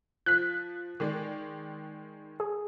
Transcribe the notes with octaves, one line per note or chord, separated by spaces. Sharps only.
F3 F#6 B6
D#3 G#3 D5
G#4